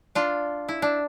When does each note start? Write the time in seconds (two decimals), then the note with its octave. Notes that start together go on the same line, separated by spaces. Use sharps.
0.15 D4 F4
0.69 E4
0.82 D4